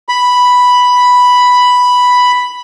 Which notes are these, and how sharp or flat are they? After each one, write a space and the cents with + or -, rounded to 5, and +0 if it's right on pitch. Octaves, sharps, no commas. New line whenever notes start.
B5 +0